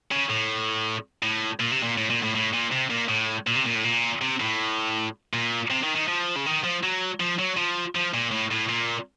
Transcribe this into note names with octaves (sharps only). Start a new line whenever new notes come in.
C#3
A2
A2
A#2
C3
A#2
A2
A#2
A2
A2
A#2
C3
A#2
A2
A#2
C3
A#2
A2
A#2
C3
A2
A#2
C3
D#3
D#3
F3
C#3
D#3
F3
F#3
F3
F#3
F3
F3
A#2
A2
A2
A#2